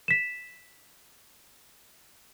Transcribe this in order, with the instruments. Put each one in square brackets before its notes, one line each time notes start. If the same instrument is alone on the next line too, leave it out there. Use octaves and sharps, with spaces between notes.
[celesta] B6 E7